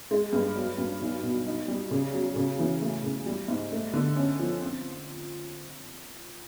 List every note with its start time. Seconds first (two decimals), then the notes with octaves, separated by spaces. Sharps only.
0.11 G#3
0.33 G2
0.56 F#3
0.78 G2
1.01 B1
1.23 B2
1.46 D#4
1.68 G3
1.91 C#3
2.13 F#3
2.36 C#3
2.59 E3
2.81 A3
3.03 C#3
3.26 G3
3.48 G#2
3.72 A3
3.93 D3
4.16 C#4
4.39 F3
4.61 C4